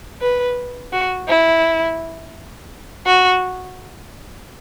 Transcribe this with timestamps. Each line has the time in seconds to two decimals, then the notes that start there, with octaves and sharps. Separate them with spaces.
0.21 B4
0.93 F#4
1.29 E4
3.06 F#4